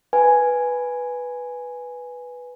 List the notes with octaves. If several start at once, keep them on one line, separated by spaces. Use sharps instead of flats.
B4 G#5